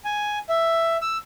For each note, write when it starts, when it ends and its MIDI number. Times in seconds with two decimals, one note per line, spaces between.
0.05 0.39 80
0.49 0.97 76
1.02 1.17 88